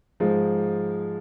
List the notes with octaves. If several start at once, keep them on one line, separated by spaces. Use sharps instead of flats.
G#2 F3 G#3